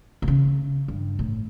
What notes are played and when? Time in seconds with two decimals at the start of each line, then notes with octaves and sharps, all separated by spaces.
0.22 A#2
0.28 C#3
0.88 G2
1.19 A2